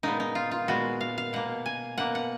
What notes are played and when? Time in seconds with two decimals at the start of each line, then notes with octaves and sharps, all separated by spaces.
0.03 A#2 G#3 B3 D#4
0.20 D#4
0.35 F4
0.51 F4
0.68 A#2 G#3 B3 F#4
1.01 F5
1.18 F5
1.33 B2 A#3 F#5
1.66 G#5
1.98 B2 A#3 F#5
2.15 F#5